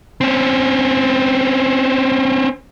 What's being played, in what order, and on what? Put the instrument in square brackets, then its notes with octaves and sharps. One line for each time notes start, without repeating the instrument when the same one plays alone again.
[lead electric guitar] C4 C#4